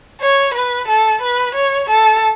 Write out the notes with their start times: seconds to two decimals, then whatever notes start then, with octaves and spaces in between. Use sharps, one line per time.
0.21 C#5
0.55 B4
0.88 A4
1.23 B4
1.55 C#5
1.90 A4